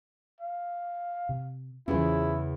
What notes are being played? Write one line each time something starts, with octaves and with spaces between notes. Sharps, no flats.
F5
C3
E2 C#3 E3 C#4 E4 F4 G#4 C5